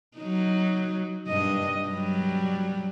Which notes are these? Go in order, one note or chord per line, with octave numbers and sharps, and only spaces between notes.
F#3 D#4
G2 D#5
F#3 G3